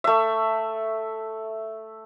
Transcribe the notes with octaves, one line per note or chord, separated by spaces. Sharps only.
A3 E5